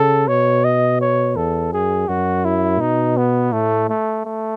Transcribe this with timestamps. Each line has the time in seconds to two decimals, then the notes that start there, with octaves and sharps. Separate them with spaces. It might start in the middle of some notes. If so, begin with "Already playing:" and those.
Already playing: C#3 A4
0.28 B2 C#5
0.65 D#5
1.01 C#5
1.36 E2 A4
1.73 F#2 G#4
2.08 F#2 F#4
2.45 E4
2.80 B2 D#4
3.17 B3
3.52 A2 A3
3.89 A3
4.25 A3